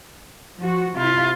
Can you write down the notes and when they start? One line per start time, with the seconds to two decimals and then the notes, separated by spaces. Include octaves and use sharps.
0.58 F3 F#4
0.97 C3 E4 F4